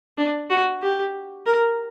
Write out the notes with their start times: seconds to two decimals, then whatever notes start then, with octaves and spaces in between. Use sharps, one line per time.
0.18 D4
0.50 F#4
0.82 G4
1.46 A#4